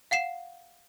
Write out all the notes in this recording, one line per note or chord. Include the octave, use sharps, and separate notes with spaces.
F5 F#5 C7 E7